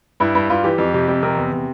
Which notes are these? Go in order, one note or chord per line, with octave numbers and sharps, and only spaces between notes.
G2 E4
G2
G2 F4
E3 G4
F2 G4
C3 G4
F2 G4
C3 A#4
E2
C3